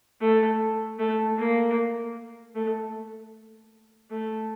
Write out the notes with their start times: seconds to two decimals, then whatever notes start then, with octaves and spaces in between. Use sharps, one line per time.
0.21 A3
0.99 A3
1.38 A#3
2.55 A3
4.11 A3